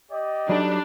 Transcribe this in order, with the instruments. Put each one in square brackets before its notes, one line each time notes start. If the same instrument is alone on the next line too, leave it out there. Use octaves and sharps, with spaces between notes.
[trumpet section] G4 D5 D#5
[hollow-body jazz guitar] F#3 D#4 A4 [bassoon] G3 [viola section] D4